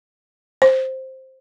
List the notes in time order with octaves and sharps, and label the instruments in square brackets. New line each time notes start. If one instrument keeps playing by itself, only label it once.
[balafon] C5